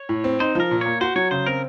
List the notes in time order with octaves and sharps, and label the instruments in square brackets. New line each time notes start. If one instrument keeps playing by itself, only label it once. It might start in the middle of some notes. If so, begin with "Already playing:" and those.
Already playing: [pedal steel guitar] C#5
[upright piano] A2
C4
[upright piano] D#4 [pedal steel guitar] C5
[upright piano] F3 [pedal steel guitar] A#4
[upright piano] A#2
[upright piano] A#3 [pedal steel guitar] C#5
[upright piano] F#4 [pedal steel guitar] C5
[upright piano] F#3 [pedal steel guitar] C#5
[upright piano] C#3 [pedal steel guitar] C5
[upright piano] C4 [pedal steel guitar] A#4